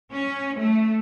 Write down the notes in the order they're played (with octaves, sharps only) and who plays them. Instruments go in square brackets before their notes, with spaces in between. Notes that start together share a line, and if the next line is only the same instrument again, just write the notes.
[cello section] C#4
A3